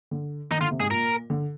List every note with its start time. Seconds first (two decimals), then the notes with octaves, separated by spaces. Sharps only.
0.11 D3
0.51 D#3 D#4
0.61 D3 F4
0.71 C3
0.80 G#2 G#4
0.91 A#2 A#4
1.30 D3